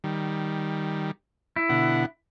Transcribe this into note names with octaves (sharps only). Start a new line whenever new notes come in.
D#3 G3
E4
B2 D3 F#5